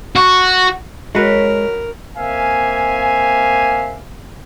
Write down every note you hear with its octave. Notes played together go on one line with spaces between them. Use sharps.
F#4
F#2 G#3 F#4 A#4 B4 C#5
A#3 C4 E5 F5 G#5